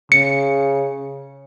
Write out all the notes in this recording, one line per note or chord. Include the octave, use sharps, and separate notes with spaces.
C#3 C#7